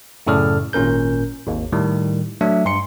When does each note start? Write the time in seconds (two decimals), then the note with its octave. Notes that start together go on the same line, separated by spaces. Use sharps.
0.27 F#2 A2 C#3 A4 D5 F6
0.73 G#1 A#2 C#4 A#4 G6
1.47 G#1 D#2
1.73 A2 D#3 G3
2.41 F#3 A3 D4 E5
2.65 G2 C6 C#7